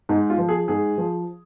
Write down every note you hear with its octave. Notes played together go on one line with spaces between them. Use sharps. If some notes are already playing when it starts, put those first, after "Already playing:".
G#2 D#4
F4
F3
G#4
G#2 G#4
F3